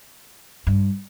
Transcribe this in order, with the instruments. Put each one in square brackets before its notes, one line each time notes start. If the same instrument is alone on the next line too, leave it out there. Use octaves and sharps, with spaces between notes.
[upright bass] G2